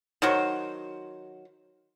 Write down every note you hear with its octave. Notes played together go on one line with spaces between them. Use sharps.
D#3 F#3 F#4 C5